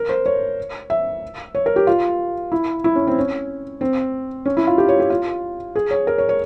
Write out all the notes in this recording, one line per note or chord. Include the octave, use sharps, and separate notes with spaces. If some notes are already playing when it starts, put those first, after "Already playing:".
Already playing: A#4
C5
C#5
E5
C#5
A#4
G4
F4
E4
E4
C#4
C4
C#4
C4
C#4
E4
F4
G4
C#5
G4
F4
G#4
C#5
A#4
C#5
C#5